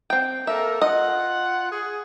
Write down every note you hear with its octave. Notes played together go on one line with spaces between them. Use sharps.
C4 G5
A#3 A4 A#4 E5
F4 D#5 F#5
G#4